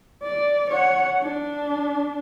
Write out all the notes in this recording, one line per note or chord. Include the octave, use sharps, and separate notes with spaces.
D5
C#5 F#5
D4